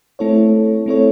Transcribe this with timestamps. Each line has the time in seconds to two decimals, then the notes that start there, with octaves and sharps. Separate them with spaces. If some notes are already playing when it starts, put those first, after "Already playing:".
0.19 A3 C4 E4 A4 C#5
0.86 A3 C4 E4 A4 C#5